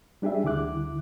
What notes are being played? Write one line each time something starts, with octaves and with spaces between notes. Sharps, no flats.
G3 D4 G4 G#4 E5
D2 D3 E4 D6 F#6